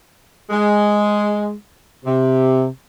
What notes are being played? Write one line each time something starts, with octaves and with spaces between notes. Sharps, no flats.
G#3
C3